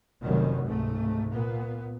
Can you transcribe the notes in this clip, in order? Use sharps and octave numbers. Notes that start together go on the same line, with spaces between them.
F1 F#2 D#3 F#3 G3
C#2 G#2 C3 A3
A#2 B3